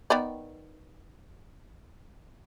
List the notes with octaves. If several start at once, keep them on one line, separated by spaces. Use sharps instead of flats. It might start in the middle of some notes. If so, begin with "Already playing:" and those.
D#3 B3 D5